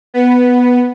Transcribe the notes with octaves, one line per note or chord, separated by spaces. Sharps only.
B3